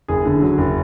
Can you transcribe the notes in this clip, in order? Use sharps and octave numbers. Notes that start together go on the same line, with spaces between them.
F#1 G#4
D3
F#3
F#1